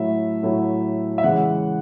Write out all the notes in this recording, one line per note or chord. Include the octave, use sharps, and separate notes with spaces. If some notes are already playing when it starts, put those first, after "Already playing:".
Already playing: A2 F#3 A3 E4 E5
A2 F#3 A3 E4
E5
C#3 E3 G#3 F#5